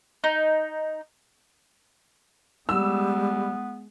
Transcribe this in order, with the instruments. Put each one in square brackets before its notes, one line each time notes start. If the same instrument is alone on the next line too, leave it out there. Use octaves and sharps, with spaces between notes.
[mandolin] D#4
[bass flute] G3 [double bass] G#3 [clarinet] B3 [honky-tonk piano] E6